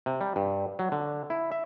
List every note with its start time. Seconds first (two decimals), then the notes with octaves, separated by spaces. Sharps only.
0.06 C3
0.21 G3
0.36 G2
0.79 F#3
0.92 D3
1.30 E4
1.52 E5